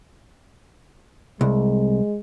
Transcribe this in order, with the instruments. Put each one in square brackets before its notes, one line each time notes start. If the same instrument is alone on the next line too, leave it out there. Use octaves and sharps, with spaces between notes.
[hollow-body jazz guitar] C2 [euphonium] G#3